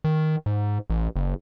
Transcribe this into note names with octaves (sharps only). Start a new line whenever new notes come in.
D#3
G#2
A1
F#1